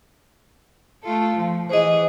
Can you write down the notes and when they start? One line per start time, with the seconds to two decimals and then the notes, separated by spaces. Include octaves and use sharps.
1.03 A3 F4 A4
1.36 F3
1.69 E3 G#4 C5 D#5